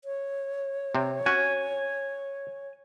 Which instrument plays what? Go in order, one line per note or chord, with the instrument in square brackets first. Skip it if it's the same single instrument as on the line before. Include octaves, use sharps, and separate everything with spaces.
[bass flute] C#5
[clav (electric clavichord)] C3 C4
[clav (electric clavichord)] C#4 F#4 [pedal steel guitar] G#5